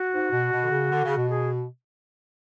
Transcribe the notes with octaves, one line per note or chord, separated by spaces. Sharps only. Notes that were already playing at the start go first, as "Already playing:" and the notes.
Already playing: F#4
G#2
B2
B2
D3
C#3
D3
C#3
B2
G#4